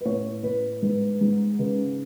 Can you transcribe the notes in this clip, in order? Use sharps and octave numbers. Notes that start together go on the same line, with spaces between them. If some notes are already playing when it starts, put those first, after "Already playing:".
B4
A2 C#5
A2 B4
G#2 B4
G#2
C#3 B4